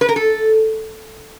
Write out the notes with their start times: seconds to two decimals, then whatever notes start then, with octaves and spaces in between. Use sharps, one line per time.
0.01 B4
0.09 A#4
0.16 A4